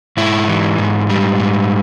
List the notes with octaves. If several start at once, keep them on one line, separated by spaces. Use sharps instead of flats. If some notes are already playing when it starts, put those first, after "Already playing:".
G#2 E4
E3
G#2
G3
G#2